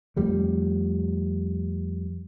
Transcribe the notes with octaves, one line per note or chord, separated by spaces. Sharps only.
F2 F3 G3 A3